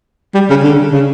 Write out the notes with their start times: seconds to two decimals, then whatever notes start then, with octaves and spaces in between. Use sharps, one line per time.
0.35 G3
0.50 C#3
0.63 D3
0.92 C#3